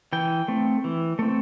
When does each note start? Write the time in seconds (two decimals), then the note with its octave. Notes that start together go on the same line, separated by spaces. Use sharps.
0.13 E3 G5
0.48 A3 C4
0.84 E3
1.19 A3 C4